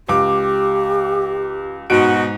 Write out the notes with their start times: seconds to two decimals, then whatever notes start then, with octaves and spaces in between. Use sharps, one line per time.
0.08 C#2 G4 D6
1.90 G#2 B2 D#4 F#4 D7